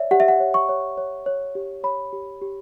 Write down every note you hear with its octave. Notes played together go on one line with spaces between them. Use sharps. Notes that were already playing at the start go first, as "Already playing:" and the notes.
Already playing: C#5 D5 E5
G4 F#5
E5
F#5
C#5
C#6
C#5
C#5
C#5
G4
C#5 B5
G4
G4